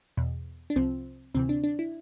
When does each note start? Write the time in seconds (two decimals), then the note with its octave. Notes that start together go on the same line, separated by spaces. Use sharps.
0.17 E2 B2
0.70 D4
0.76 C2 C3 F3 C4
1.34 D2 C3 E3 C4
1.49 D4
1.64 D4
1.79 E4